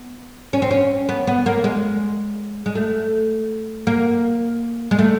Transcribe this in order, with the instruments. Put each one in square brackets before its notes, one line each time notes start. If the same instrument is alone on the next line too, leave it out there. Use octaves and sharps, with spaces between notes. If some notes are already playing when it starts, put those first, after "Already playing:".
Already playing: [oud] B3
C#4
C4
C#4
B3
B3
A#3
G#3
G#3
A3
A#3
G#3
A3